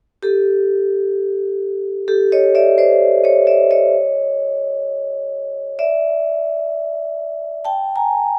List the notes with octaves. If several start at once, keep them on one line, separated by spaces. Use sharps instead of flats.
G4 A4
G4 A4
C#5 D#5
D5 E5
C5 D5
C#5 D#5
D5 E5
C#5 D#5
D5 E5
G5 A5
G#5 A#5